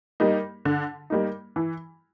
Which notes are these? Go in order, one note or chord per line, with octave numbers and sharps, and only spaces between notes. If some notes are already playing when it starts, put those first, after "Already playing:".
G3 A#3 D#4
D3
G3 A#3 D#4
E3